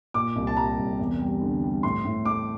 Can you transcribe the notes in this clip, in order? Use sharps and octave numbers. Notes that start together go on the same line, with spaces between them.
A#2 D6
C2
A5
G3 A#5
C2
E2
G3
D3
G3
A2 C6
A2
A3 D6